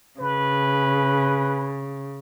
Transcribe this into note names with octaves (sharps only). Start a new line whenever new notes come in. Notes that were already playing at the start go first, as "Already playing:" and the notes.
C#3 B4